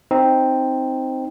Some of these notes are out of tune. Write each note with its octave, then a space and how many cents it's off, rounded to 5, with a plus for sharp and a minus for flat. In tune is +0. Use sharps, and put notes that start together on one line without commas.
C4 +0 D#4 +0